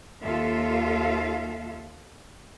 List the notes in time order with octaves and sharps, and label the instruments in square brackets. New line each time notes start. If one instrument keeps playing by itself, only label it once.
[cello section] D#2 F4 A4 E5 F5